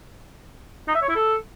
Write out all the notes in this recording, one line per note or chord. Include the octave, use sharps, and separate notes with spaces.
D#4
E5
C#5
E4
A4